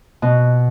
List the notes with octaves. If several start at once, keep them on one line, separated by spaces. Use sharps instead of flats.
B2